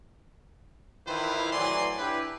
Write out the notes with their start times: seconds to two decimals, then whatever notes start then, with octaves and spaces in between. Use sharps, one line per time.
1.07 D#3 E3 E4 F4 B4 C5
1.53 A2 E3 F#3 D5 G#5 C6
1.98 D4 E4 G4 B4